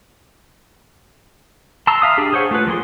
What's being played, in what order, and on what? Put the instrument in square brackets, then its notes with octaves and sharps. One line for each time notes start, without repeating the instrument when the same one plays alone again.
[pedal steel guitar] A5 A#5 C6 E6
E5 F5 D#6
D4 G4 G#4
G#4 C5 C#5 F#5
A3 F4 B4
F3 A#3 G#4 C6